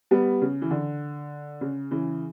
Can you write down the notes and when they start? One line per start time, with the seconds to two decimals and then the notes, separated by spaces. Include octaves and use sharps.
0.11 G3 B3
0.41 C#3
0.62 E3
0.71 D3
1.61 C#3
1.91 C#3 E3